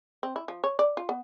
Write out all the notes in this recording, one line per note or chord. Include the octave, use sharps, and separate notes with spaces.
C4
E4
F3
C#5
D5
F4
B3